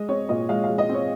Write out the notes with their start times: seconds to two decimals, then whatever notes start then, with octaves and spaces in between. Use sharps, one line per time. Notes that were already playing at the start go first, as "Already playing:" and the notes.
Already playing: G#3 D#5
0.09 C4 C#5
0.29 A#2 D#5
0.49 G#3 F5
0.64 F5
0.69 G#3
0.78 D#5
0.89 C4
0.94 C#5